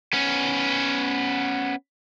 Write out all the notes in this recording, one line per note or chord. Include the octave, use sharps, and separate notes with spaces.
B3 C#4